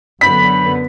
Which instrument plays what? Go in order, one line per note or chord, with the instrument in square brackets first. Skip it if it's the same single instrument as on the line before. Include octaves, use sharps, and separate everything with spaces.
[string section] F#2 D3 B3 [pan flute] B5 [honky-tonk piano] B6